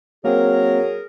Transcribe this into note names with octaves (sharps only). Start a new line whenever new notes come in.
F#3 A#3 C4 G#4 A#4